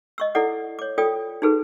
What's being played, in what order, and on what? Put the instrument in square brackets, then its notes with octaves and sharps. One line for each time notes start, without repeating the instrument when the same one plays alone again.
[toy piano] D#5 C#6 E6
E4 A4 D5 F#5 D6
C#5 D6
F4 A4 D5 G5 D#6
D#4 F#4 G#4 A4 B4